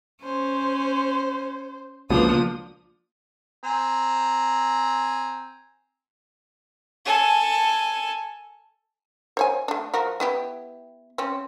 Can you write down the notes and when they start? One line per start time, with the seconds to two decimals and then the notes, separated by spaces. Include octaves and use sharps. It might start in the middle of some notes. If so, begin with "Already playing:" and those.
0.24 C#4 C5
2.10 C#2 B2 F3 A#3 D4 D#6
3.64 C4 G#5 A#5
7.06 A4 G#5
9.37 C5 C#5 G#5
9.68 A3 D4
9.94 F3 F#4 A#4
10.20 B3 E4 G4
11.18 C4 C#4